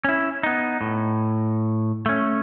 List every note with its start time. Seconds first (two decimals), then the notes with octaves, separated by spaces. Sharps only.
0.04 C#4 E4
0.43 B3 D#4
0.81 A2
2.06 A3 C#4